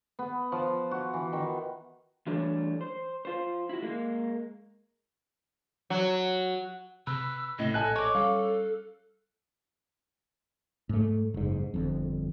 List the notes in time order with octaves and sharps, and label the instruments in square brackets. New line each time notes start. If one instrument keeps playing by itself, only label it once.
[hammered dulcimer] B3
F3
F#4
E3
D#3
[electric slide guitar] E3 G3 A3 D4 F#4 C#5
C5
F4 C5
E4 F#4
G#3 A#3
[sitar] F#3
[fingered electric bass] C3 [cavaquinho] B4 [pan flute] E6
[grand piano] A2 [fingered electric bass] C3 C4 C#4 [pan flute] D#5
[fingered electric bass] A#1 [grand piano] A4 G#5 F#6
[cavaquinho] C#5 D6
[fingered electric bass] G3 C#4 [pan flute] A4 [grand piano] F5
[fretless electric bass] G#2 A3
F#1 G#2
G1 F2